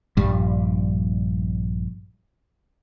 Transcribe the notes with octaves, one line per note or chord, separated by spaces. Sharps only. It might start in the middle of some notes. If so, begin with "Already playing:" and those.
A#1 G2 G3